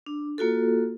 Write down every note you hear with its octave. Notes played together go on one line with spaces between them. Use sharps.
D4
A#3 F4 F#4 A4